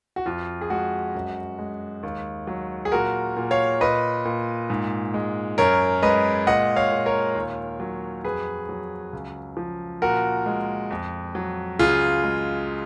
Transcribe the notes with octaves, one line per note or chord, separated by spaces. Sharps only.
F#4
F2 F4
G#4
G#3 F#4
F#2
G#3
D#2
F#3
G#4
A#2 F#4 A#4
A#2
C#5 F5
A#2 B4 D#5
A#2
G#2
G#3
F#2 A#4 C#5
G#3 B4 D#5
A#2 D#5 F#5
C#5 F5
A#2
A#4 C#5
D#2
F#3
F2 G#4 B4
F#3
C#2
F3
A#2 F#4 A#4
G#3
F2
F#3
C#2 F4 G#4
G#3